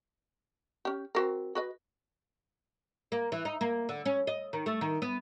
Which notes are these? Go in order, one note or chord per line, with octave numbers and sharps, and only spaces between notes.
C#4 G4
C4 F#4 A#4
F#4 B4 D#5
A#3
E3
D#4
A#3
D3
C#4
D#5
D#3
A3
D#3
B3